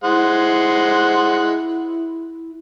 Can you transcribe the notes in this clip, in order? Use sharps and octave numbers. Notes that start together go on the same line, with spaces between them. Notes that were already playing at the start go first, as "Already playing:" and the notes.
G#3 E4 C5 F#5